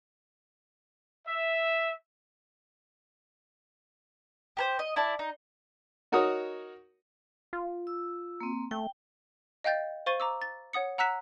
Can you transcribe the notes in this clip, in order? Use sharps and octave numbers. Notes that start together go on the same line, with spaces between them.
E5
G4 A#4 C5
D#5
E4 D5 A5
D#4
D#4 F#4 A#4 C#5 D#6
F4
E6
A#3 C4
A3 G5
D#5 F5 G5 G6 A6
C5 F5 C#6 A6 D#7 G7
A#5 D6 E6
A6
C#5 F#5 D#6 C#7
F#5 A#5 E6 F#6 B6 E7